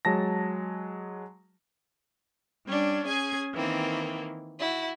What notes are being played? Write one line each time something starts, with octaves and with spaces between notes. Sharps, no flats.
F#3 G#3 A5 A#6
G3 C#4 D4
C#4 G#4 G#5 G#6
D#3 E3 A#3 C4
E4 F#4